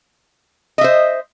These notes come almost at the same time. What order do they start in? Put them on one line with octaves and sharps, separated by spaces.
D#5 E5 C5